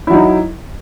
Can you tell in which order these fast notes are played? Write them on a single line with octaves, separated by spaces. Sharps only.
E4 F#3 D#4